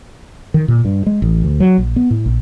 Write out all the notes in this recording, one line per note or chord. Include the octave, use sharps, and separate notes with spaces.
D#3
A#2
G2
G#3
A1
D2
F#3
A#1
B3
A2
A#1